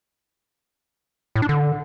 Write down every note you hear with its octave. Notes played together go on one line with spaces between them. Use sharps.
A2
D4
D3